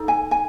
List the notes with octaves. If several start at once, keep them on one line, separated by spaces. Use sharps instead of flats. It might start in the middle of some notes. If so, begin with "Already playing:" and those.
Already playing: D#4 A4
G#5
G#5